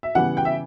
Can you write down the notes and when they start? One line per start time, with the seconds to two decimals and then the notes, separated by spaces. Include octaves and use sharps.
0.03 E5
0.15 C#3 E3 G3 B3 F#5
0.37 G5
0.45 E5